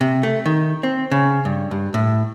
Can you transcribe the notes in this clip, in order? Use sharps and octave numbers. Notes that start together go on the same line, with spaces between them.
C3
A3
D#3
C4
C#3
G2
G2
A2